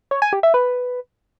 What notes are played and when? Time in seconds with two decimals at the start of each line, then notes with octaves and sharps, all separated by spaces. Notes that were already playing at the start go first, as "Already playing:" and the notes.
0.11 C#5
0.22 G#5
0.33 G4
0.43 E5
0.54 B4